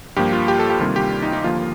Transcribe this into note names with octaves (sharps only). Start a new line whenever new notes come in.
G2 F3 A#3 G4
F4
G4
A4
G4
D2 C3 D#3 G3 A#3 F4
G4
D#4
D#4
D#2 D3 F3 A#3 F4